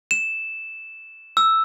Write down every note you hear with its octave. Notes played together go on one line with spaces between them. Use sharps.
E7
E6